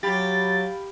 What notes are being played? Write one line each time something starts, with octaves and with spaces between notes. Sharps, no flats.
F#3 G4 F5 B5 A6